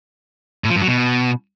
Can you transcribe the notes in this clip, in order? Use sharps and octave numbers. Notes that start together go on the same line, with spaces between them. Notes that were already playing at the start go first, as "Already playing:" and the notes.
A2
F3
G2
F#3
B2